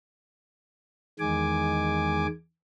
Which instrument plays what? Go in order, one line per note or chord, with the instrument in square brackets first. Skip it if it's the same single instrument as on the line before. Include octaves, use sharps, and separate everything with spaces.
[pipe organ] E2 D#3 G#3 G#5 D6